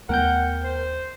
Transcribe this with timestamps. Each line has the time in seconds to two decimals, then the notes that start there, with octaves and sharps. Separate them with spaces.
0.09 D#2 A3 B3 A#4 F#5 G5 G6
0.64 C5